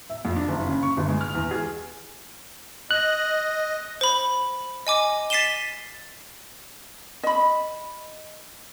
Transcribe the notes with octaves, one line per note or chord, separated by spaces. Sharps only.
E5
F2
D4
F#1
C#3
C#6
G1
G#3
F6
E2
G#4
D#5 F#6
C5 B5
D#5 G#5 D6
A6 B6 C7 D#7 E7 G7
D#5 B5